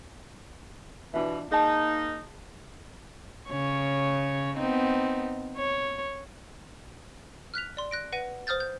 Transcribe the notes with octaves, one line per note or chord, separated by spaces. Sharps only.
B2 E3 D4 F4 E5
A#3 D#4 G#4 A5
C#3 C#5
B3 C4 D#4
C#5
F6 F#6 B6 F7
D5 C6
F#6 A#6 D7
B4 F#5 A#6 D#7
C5 D#6 F6 G6 A6
G6